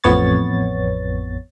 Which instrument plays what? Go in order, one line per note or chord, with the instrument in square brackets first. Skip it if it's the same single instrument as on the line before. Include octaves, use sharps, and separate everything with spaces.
[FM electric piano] A1 F2 B3 C#5 A6